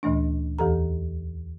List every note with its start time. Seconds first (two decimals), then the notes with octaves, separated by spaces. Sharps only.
0.03 D2 A#2 E3 A3 D4
0.59 E2 E3 G4 A4 A#5